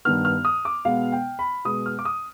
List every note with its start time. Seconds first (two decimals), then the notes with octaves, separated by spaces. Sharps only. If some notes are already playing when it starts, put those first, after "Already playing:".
0.05 G2 D#3 B3 F6
0.25 F6
0.45 D#6
0.65 D6
0.85 B2 G#3 B3 F5
1.12 G5
1.39 B5
1.65 B2 G#3 B3 D#6
1.86 F6
1.99 D6
2.05 D#6